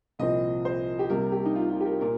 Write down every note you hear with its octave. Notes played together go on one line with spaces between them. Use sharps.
C2 A#2 F3 C4 D#5
C5
G4
C2 C3 G3 A#3 A#4
G4
D#4
F4
F4
G4
A#4
A#2 A#4